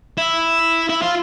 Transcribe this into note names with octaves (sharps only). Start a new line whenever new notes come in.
E4
E4
F4